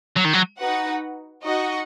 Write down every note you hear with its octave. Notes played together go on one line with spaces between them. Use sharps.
F#3
D#3
F#3
D#4 F#4 B4 F#5
D#4 F#4 D#5 F#5